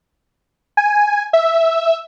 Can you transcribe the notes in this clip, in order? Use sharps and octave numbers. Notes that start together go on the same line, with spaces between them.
G#5
E5